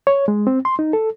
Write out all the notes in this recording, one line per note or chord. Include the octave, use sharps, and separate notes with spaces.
C#5
G#3
C4
C6
D#4
A4